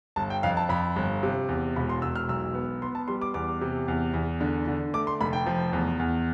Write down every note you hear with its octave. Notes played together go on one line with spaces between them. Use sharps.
G1 A5
G5
F2 F5
A5
F2 B5
G1
C3
E2
E1 B5
C6
E1 E6
F6
B1 E6
B3
B3 C6
A5
G3 C6
D6
E2 D6
C3
E2
E2
D3
D3
A3 D6
C6
F1 B5
G5
F3
E2
E2